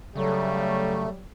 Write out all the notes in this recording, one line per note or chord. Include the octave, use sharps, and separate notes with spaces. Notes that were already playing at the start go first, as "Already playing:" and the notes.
C#3 F#3 G3 A3